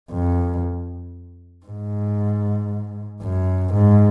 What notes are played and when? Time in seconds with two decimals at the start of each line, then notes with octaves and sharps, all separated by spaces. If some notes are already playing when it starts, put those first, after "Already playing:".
0.11 F2
1.66 G#2
3.22 F#2
3.74 G#2